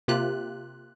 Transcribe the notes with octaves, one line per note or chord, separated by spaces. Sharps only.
C3 A#3 F4 G4 F#6